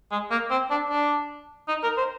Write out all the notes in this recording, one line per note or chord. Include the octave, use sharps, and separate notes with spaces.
G#3
A#3
C4
D4
D4
D#4
A#4
C5